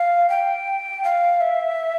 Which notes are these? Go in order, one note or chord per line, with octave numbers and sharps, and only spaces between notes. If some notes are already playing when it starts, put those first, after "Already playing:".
Already playing: F5
G5
F5
E5